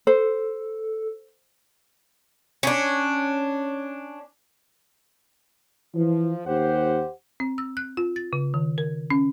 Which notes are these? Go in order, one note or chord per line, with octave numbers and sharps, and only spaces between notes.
A4 C5
C#4 D4
E3 F3
D#2 G4 C5 F#5
C4
E6
F#6
F4
A6
C#3
D#3
A#4
C#4